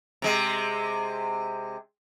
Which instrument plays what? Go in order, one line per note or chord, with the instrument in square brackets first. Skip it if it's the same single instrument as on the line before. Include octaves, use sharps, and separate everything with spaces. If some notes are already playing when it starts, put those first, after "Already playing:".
[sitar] C3 G#3